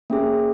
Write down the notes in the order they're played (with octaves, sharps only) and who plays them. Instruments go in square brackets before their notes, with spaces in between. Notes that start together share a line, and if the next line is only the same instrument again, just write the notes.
[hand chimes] A#3 C#4 G#4